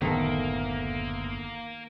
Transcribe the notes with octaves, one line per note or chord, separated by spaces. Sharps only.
F#1 D2 A2 D#3 A#3 B3 A4